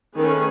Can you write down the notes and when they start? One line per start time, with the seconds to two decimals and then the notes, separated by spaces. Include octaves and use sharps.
0.15 D#3 A3 C#4 G#4 B4